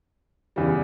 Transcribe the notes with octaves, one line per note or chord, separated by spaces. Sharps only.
E2 C#3 G3